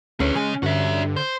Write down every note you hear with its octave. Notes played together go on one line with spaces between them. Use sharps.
D2 C#4 G#4 B4
C#3 G#3 G#5
G2 D3 F#4 E5
C5